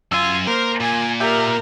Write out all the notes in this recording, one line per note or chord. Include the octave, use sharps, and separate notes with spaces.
F#2 F4 G#5 E6
A#3 A#4 C5
A#2 G#5
G4 A#4 E5 G6